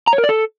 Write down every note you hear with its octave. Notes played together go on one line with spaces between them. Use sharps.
A#5
C#5
A#4
D5
A4